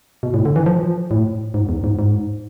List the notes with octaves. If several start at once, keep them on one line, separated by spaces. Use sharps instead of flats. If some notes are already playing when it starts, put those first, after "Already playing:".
B2
A2
D3
E3
F3
A2
G#2
E2
G#2
G#2